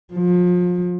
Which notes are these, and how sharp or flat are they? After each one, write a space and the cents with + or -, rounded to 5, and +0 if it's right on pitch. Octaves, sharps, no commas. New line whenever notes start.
F3 +30